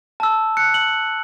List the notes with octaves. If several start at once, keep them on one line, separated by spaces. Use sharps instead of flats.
A5 E6
F#6 C#7
F#7